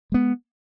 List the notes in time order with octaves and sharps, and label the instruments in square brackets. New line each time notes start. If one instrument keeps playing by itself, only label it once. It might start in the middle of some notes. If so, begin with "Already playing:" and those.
[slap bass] G#3 B3